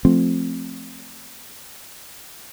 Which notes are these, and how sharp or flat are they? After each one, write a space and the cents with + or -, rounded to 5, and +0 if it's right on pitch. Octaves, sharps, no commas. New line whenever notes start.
F3 +0 A3 +0 C4 +0